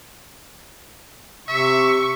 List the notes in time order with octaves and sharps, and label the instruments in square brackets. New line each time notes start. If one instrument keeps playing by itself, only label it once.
[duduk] C3 [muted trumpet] E5 [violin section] C#6